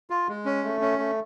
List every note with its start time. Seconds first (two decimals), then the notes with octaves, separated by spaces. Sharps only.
0.10 F4
0.28 G#3
0.45 C#4
0.64 A3
0.81 C#4
0.98 A3